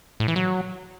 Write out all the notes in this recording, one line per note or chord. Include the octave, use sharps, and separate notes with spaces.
A2
E3
F#3